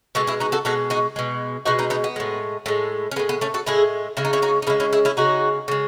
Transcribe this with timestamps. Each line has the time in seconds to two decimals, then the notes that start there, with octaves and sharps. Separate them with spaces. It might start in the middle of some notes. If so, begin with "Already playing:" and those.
0.15 B2 G#3 F#4 A4
0.27 E4 G#4
0.40 D#4 F#4
0.52 F#4 A4
0.65 B2 G#3 F#4 A4
0.90 D#4 F#4
1.16 B2 G#3
1.66 B2 G#3 D#4 F#4
1.79 B3 D#4
1.90 B3 D#4
2.04 B3
2.16 A2 G#3
2.66 A2 G#3
3.11 C#4
3.16 G#3 B3
3.19 A2
3.29 B3
3.41 A3 C#4
3.54 F#4 A4
3.66 A2 G#3 E4 G#4
4.17 C#3 G#3 E4
4.25 D#4
4.33 C#4 E4
4.42 D#4 F#4
4.62 D#4
4.67 C#3 G#3 C#4 E4
4.80 C#4 E4
4.93 E4 G#4
5.05 C#4 E4
5.17 C#3 G#3 D#4 F#4
5.68 C#3 G#3